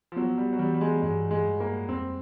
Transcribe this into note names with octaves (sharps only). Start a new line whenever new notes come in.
F3
F#3 B3
G3
F#3
E3 G3
G3
G#3
G2 G#3
G#3
G3
A#3
F2 C4